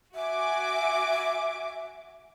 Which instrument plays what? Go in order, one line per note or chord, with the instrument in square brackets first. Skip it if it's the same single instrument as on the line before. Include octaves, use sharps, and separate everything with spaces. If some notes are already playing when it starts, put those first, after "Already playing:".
[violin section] F#4 G#5 D6 [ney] E5